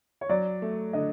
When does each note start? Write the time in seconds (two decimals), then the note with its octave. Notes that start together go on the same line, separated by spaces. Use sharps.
0.21 C#5
0.29 F#3 D5
0.62 A3
0.93 D3 D#5